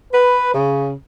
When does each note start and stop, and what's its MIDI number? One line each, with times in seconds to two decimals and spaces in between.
0.13 0.51 71
0.54 0.92 49